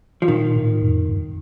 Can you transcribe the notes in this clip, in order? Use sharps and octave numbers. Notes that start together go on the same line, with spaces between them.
F3
A#2 D#3
A2
F2
G2